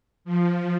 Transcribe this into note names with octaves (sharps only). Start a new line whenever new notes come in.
F3